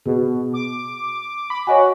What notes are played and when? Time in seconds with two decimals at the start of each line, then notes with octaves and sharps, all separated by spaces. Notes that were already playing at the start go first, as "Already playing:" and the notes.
0.06 B2 G#4
0.54 D6
1.50 B5
1.67 F#4 C#5 D#5 G#5